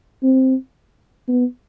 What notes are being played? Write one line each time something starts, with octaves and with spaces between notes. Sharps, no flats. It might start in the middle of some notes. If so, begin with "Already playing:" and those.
C4
B3